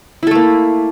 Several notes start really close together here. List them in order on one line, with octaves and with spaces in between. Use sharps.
E4 A4 A3 A#3